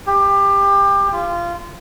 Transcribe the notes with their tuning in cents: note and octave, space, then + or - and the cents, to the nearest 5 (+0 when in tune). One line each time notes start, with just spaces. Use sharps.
G4 +25
F4 -20